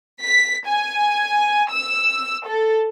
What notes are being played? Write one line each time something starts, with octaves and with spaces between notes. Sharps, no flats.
B6
G#5
E6
A4